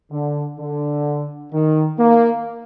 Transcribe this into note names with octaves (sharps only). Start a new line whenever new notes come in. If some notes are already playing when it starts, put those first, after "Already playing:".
D3
D3
D#3
A#3